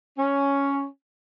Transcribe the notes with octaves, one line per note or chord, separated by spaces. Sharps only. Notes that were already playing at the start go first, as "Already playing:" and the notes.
C#4